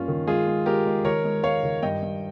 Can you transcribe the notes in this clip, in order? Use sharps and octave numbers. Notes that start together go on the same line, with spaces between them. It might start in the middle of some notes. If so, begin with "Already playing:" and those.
Already playing: G2 A#3 C#4 F4
D#3
G#3 F4 G#4
G#3
G#3 G4 A#4
G#3
D#3 A#4 C#5
G#3
G#3 C#5 F5
D#3
G2 D#5 G5
G2